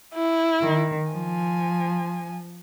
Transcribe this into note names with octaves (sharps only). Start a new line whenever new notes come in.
E4
D#3
F3 G#5